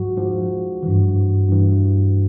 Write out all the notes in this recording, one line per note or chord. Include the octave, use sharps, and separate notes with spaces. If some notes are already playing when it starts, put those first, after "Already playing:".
Already playing: G#2 F3 F#4
G#2 F3
G2 E3
G2 E3